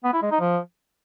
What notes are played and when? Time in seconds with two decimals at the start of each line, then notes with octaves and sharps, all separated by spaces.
0.04 B3
0.13 E4
0.22 G#3
0.31 D#4
0.40 F3